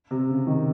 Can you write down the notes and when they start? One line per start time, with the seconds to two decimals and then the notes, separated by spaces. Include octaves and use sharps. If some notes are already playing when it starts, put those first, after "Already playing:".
0.11 C3
0.29 C#3
0.47 D#3